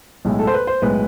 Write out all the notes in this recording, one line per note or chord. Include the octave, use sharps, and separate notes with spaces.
B1 A2 G#3
A4
C5
B4
C5
B1 A2 G#3 B4